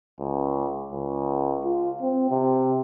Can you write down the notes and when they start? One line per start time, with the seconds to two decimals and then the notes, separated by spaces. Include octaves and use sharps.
0.20 C#2
0.92 C#2
1.65 F4
2.02 C4
2.31 C3